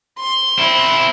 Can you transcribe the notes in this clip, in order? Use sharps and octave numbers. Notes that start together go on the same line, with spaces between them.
C6
C4 E4